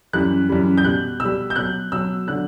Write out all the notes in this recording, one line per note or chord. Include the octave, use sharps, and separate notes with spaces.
F#2 E3 G3 F#6
F#2 E3 G3
G6
B2 G3 F#6
B2 E6
G3
G6
B2 F#3 F#6
B2 F#3 E6
D3 F#3 F#6